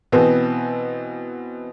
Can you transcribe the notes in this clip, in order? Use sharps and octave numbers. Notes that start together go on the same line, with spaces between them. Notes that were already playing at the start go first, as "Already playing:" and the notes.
B2 E3 B3 C4